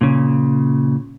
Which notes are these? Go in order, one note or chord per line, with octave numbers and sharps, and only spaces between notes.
A#2 C#3